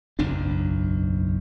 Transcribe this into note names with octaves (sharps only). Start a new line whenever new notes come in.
F#1 B1 E2 D4